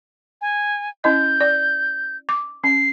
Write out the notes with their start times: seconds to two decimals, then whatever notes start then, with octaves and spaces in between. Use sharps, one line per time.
0.41 G#5
1.04 C#4 E4 D#5 G6
1.41 D5
2.29 D6
2.64 C#4 C7